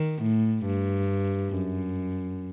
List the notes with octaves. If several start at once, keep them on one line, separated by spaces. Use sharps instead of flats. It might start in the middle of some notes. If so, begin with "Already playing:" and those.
Already playing: D#3
A2
G2
F#2